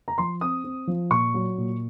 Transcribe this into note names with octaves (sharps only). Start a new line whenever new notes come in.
A#5
F3 C6
C4 D#6
C4
F3
A#2 C#6
F#3
A#2